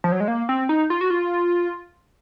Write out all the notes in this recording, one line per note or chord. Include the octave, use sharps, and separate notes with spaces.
F3
F#3
G#3
A#3
C4
D#4
F4
F#4
F4